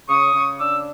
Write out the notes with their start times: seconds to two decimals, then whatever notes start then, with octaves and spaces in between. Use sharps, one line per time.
0.09 C#3 C#6 D#6
0.35 C#3
0.59 D4 D6 E6